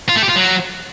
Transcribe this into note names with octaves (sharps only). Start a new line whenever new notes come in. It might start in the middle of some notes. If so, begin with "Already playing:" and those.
F4
A3
G4
F4
F#3